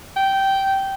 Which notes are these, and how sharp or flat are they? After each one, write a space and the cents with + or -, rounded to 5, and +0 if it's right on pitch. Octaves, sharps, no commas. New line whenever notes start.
G5 -10